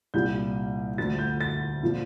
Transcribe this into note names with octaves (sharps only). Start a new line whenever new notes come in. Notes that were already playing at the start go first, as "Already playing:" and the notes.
C2 A#2 G3 G6
D2 D3 F3 A6
G6
A6
A#2 F3